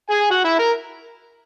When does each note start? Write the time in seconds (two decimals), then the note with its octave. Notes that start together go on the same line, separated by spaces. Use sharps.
0.10 G#4 G#5
0.30 F#4 F#5
0.44 E4 E5
0.59 A#4 A#5